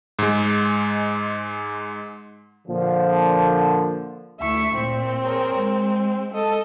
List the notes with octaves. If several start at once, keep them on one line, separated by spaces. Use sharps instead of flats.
G#2 G#3
A#2 D3 F3
D2 A3 E4 E5 C#6
A#2 C4
G#4 A#4 C#5
G#3
A4 D#5